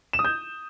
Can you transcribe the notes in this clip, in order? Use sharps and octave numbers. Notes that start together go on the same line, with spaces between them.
E7
D#6
G6